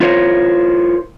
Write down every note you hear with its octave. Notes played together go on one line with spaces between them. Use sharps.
E4 F4 A#4 C5 C#5